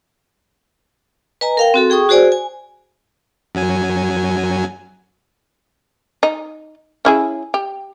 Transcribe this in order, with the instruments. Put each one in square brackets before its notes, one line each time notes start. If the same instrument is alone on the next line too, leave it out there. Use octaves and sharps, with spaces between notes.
[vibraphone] B4 D#5 G#5 A#5
A#4 F5 G5
C4 F#4 A4
G#4 G5 C#6 D#6
F#4 G#4 C5 D5 G#5
G#5
[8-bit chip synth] F#2 F#3 G#5
[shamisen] D#4
C#4 E4 G#4
G4